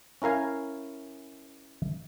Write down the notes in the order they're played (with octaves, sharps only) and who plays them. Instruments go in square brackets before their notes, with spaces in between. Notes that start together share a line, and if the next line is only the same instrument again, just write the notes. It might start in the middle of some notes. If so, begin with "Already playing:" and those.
[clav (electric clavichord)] C#4 E4 A#4 F5 G#5